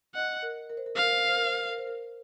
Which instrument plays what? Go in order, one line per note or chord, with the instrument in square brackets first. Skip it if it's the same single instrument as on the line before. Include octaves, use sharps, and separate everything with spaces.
[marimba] D#5 [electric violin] F#5
[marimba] A#4
A#4
C5
A#4
[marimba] C5 [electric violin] F5
[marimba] A#4
C5
A#4
C5
A#4
C5
A#4
C5
A#4
C5
A#4